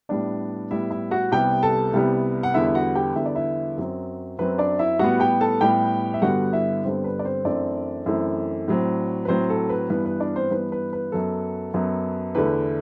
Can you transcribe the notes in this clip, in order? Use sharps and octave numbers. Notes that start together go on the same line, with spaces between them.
A2 G3 B3 D4 D5
A2 G3 B3 E4 E5
E4 E5
F#4 F#5
C2 C3 G3 B3 G4 G5
A4 A5
C2 C3 G3 B3
F#5
E2 D3 G3 B3 E4 E5
E5
F#4 F#5
G4 G5
E2 D3 G3 B3 E5
D5
E4 E5
F#2 F#3 C4
F#2 F#3 C4 B4
D4 D5
E4 E5
A2 G3 B3 F#4 F#5
G4 G5
A4 A5
A2 G3 B3 G4 G5
E5
G2 D3 G3 B3 F#4 F#5
E4 E5
G2 D3 G3 B3 C4 C5
B4
D5
C4 C5
F#2 E3 A3 C4 D4 D5
F#2 E3 A3 C4
A2 F#3 C4
B4
A2 F#3 C4 C5
A4
B4
G2 E3 B3 B4
B4
D4 D5
C4 C5
G2 E3 B3 B4
B4
B4
F#2 F#3 B3 A4
F#2 F#3 B3
E2 D3 A3 B4